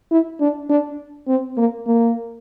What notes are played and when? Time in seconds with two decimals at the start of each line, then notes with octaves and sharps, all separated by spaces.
0.11 E4
0.40 D4
0.69 D4
1.28 C4
1.57 A#3
1.86 A#3